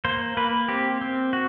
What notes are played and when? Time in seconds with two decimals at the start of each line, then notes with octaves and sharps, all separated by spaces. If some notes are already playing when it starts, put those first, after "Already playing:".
0.05 A#3 C5
0.37 A#3 B4
0.68 C4 G4
1.01 C4
1.33 F#4